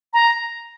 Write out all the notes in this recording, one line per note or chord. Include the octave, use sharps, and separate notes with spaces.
A#5